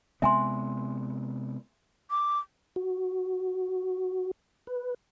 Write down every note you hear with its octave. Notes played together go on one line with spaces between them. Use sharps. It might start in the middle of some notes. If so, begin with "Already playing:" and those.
C3 G#3 B3 E5 G#5 C6
D6
F#4
B4